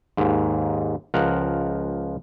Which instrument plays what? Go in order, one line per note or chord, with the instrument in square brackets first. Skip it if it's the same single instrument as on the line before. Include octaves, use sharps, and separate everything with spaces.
[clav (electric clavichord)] D#2 G#2
C#2 F3 A#4 F#5